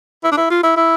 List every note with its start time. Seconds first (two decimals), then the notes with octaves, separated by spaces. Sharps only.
0.24 E4
0.32 D4
0.37 E4
0.50 F4
0.63 E4
0.77 E4